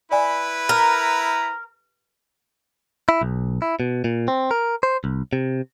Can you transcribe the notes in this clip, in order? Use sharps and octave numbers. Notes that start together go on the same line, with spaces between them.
E4 B4 D5 G#5
A#4 A#5
E4
B1
E4
B2
A#2
C4
A#4
C5
C2
C3